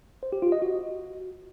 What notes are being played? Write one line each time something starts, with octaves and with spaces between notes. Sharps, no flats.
C5
G4
F4
D#5
F#4